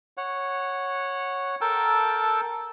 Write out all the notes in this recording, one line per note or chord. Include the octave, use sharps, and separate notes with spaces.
C#5 F#5
A4 A#4 G5 A5